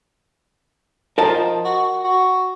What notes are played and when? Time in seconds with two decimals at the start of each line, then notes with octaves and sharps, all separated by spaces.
1.18 F3 A#4 D#5 A5
1.65 F#4
2.05 F#4